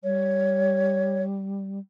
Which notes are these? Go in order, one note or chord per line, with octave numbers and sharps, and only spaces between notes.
G3 C#5